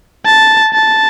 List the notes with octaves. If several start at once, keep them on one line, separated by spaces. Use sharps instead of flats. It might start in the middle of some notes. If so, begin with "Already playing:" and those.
A5
A5